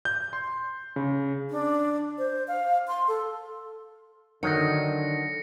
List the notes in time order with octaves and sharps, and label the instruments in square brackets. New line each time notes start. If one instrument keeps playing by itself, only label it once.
[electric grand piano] G6
C6
C#3
[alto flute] D4
C5
F5
C6
A4
[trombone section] D3 [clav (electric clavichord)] D#3 F#3 [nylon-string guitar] D#4 [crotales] A#6 C#7